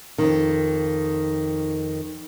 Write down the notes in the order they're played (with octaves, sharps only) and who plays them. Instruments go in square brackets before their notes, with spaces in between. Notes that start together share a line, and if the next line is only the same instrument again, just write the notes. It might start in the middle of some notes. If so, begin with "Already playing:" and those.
[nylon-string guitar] F2 D#3